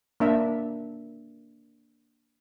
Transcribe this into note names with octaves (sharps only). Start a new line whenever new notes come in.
A#3 D4 E5